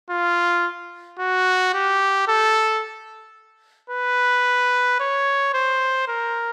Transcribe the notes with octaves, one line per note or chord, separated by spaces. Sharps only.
F4
F#4
G4
A4
B4
C#5
C5
A#4